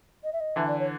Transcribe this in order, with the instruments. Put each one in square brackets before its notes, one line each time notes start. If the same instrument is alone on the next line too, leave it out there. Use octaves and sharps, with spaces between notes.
[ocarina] D#5
E5
D#5
[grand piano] D3 E3 [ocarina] E5
[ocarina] D5
C#5